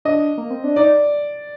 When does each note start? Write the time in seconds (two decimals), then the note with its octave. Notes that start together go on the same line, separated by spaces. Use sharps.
0.05 D4 D#5
0.38 A#3
0.50 C4
0.64 D4
0.76 D#4 D5